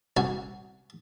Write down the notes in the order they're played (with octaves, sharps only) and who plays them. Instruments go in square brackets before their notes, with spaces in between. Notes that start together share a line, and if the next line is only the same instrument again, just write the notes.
[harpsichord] C2 F#4 G#5